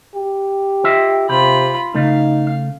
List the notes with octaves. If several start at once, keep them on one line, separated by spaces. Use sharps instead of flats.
G4
F4 D#5 E5
C3 F4 G4 B5
C#3 A3 D#4 F5